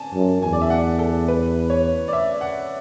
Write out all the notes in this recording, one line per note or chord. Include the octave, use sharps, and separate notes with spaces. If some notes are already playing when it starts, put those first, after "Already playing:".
Already playing: G#5 A5
F#2
E2 G#5
D5
E5
F#5
A4
B4
C#5
D5
E5
F#5